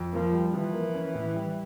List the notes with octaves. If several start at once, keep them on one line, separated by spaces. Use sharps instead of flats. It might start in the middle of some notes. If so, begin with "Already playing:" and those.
Already playing: F2
F3 A#3
G3
E3 F3
A#3
C#4
A2
G3